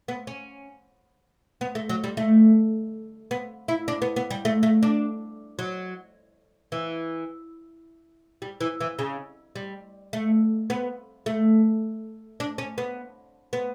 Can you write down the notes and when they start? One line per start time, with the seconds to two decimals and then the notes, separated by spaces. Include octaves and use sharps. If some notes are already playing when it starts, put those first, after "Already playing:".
0.08 B3
0.27 C#4
1.61 B3
1.75 A3
1.89 F#3
2.04 G3
2.17 A3
3.31 B3
3.68 E4
3.88 D4
4.02 B3
4.16 B3
4.31 G3
4.45 A3
4.63 A3
4.83 D4
5.59 F#3
6.72 E3
8.42 G3
8.61 E3
8.80 E3
8.99 C#3
9.56 G3
10.13 A3
10.70 B3
11.26 A3
12.40 D4
12.58 C#4
12.78 B3
13.53 B3